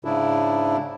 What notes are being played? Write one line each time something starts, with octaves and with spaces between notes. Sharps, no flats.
G#2 C#3 D4 E4